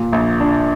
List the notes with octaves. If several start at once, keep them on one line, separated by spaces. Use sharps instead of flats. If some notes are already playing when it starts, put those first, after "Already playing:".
Already playing: A#2
A#1
D4